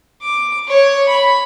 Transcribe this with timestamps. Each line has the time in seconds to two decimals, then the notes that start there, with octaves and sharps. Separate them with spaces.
0.22 D6
0.68 C#5
1.09 B5